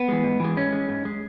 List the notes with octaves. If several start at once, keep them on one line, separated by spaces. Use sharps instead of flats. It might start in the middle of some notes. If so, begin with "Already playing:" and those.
Already playing: B3
E3 G#3
G#2
E3 G#3
G#2 C#4
G#3
G#2
G#3